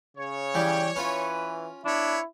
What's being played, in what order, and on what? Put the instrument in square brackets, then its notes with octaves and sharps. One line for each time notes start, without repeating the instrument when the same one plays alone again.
[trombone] C#3 [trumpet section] C#5
[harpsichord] E3 G3 [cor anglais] G5
[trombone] E3 [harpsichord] C#4 F4 [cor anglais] B4
[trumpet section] B3 C#5 B5 [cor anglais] D4 [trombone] E4